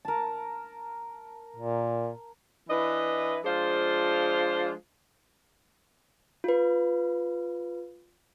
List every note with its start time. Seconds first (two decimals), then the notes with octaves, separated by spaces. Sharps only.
0.05 A#4 A5
1.56 A#2
2.69 E3 D4 E4 B4 D#5
3.44 F3 G#3 D4 F4 C5
6.44 F4 B4